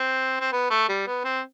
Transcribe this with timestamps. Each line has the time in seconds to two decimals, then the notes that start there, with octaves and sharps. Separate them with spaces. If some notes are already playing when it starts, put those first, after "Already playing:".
Already playing: C4
0.40 C4
0.52 B3
0.70 A3
0.89 G3
1.07 B3
1.25 C4